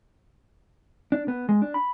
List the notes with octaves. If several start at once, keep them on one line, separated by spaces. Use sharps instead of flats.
D4
B3
G#3
D4
B5